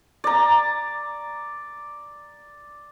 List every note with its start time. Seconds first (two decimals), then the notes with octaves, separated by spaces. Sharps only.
0.24 D5 A#5